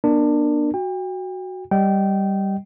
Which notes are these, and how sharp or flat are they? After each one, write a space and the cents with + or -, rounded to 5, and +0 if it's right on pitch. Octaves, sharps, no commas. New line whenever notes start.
B3 -40 D4 +20 A#4 +0
F#4 +0 G5 +35
G3 +0 D#5 +0 G5 -20